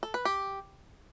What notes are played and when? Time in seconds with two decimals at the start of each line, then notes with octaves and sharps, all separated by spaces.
0.03 A4
0.14 B4
0.25 G4